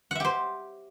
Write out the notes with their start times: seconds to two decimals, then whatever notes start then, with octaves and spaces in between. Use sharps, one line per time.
0.11 F#5
0.15 E5
0.20 G4
0.24 C5